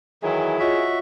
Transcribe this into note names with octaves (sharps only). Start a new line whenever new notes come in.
D#3 E3 F#3 E4 G#4
F4 F#4 C#5 D#5 E5